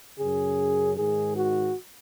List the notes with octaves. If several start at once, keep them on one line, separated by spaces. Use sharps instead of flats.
F#2 C#3 G#4
G#2 D#3 G#4
F#4